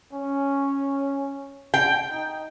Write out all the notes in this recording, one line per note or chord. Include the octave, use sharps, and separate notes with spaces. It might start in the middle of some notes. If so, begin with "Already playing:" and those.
C#4
G5
D#4